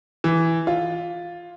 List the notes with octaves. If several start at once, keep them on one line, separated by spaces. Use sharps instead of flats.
E3
F4